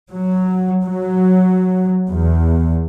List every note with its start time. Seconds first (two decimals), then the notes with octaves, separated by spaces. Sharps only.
0.11 F#3
0.85 F#3
2.10 E2